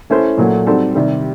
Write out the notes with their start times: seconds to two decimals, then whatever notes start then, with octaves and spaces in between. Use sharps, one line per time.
0.10 A3 C#4 E4 A4 C5
0.37 A#2 F#3 A3
0.66 G3 C4 D#4 F#4 A4
0.95 C3 D#3 G3